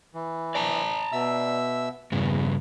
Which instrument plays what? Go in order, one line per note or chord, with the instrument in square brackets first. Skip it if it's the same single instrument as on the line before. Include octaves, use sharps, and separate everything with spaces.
[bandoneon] E3
[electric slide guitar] D5 A5 A#5
[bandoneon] B2 E5 E6
[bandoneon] E2 [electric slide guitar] G2 C#3